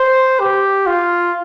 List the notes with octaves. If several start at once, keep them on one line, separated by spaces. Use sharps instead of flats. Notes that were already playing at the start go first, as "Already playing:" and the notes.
Already playing: C5
G4
F4